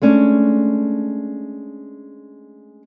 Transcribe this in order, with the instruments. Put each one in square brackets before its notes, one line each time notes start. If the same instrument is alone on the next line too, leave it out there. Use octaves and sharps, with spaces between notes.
[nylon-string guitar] G#3 A3 C#4 D4